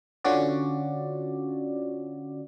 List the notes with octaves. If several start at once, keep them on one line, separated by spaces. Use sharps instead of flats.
D3 C#4 F4 F#4 D5